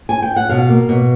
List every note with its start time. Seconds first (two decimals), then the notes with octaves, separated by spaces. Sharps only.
0.09 G#5
0.22 G5
0.36 F#5
0.49 B2 F5
0.69 A#3
0.89 B2